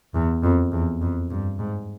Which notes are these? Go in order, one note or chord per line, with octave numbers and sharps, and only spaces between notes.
E2
F2
E2
F2
G2
G#2